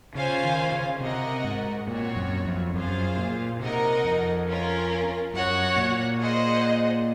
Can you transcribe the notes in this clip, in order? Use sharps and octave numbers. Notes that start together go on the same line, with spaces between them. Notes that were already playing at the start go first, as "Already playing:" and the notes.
C#3 C#4 F4 C5 F5 G#5
D#3
C#3
C3 F#4 A#4 D#5 F#5
G#2
A#2 C4 F#4 C#5
F#2
F2
F#2 F4 G#4 C5 F5
A#2
C3 D#4 A#4 D#5 F#5
F2
C#4 F4 A#4
F#2 F#4 C#5 F#5
A#2
G#4 C5 D#5 F#5